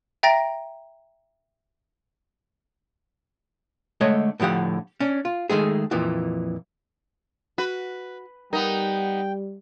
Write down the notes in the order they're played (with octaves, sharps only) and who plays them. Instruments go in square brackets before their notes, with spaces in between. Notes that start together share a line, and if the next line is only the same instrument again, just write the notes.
[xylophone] E5 G5 A#5 A6 A#6 D7
[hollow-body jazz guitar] D3 G#3 A3 C#5 D#5
A2 D3 F3 G4 F#5
C#4 D4
F4
D#3 G#3 A3 G#4
F2 A#2 E3 F3
[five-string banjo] F#4 [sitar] B4
[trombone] G3 [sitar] B3 D#4 [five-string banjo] A#4 [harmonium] G5